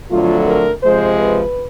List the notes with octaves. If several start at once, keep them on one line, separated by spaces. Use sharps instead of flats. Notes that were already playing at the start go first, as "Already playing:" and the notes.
F2 D3 F#3 A3 F4
A#4
C3 F3 G#3 C5
B4